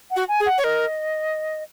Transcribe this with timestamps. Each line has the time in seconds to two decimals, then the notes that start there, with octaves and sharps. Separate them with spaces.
0.11 F#5
0.16 F#4
0.28 G#5
0.40 G#4
0.46 F#5
0.58 C#5
0.64 A#4 D#5